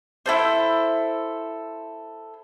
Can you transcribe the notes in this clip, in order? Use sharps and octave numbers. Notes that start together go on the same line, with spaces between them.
E4 A4 C5